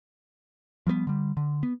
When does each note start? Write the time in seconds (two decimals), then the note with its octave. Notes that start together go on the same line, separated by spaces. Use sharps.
0.87 F3 G3 A3 B3
1.07 D3 G3
1.37 D3
1.63 B3